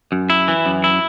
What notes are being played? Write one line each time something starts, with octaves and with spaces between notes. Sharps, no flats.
F#2
E4
E3
F#2
E4